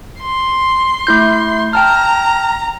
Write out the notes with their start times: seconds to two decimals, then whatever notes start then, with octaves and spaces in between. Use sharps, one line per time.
0.21 C6
1.07 A3 E4 G6
1.73 G5 A5 A#5 F6